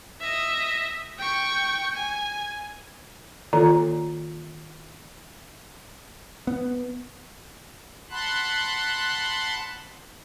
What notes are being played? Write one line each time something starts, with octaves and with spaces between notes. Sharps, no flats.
D#5 E5
G5 C#6
G#5
D#3 A#3 F4 A4 D5 A#5
B3
F#5 A5 B5 C6 F#6